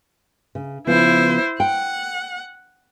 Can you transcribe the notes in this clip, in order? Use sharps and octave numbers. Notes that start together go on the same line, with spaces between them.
C#3
C#3 F3 B3 E4 C5
F#5 G5